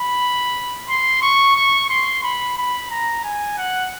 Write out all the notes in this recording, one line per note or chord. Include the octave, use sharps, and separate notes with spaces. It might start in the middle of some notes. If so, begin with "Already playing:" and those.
Already playing: B5
C6
C#6
C#6
C6
B5
B5
A#5
G#5
F#5